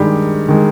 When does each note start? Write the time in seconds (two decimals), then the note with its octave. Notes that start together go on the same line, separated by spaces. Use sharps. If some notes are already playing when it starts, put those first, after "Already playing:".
Already playing: G2 D#3 G#3 G4
0.49 D#3 G#3